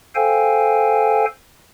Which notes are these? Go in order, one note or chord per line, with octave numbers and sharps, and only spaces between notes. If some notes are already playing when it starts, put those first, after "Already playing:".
A4 C5 F5 G5 G#5